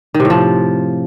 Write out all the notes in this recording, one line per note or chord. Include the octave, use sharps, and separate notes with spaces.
D#3
C3
A2
F3